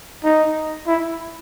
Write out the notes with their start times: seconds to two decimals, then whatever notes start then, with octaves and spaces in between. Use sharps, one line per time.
0.24 D#4
0.87 E4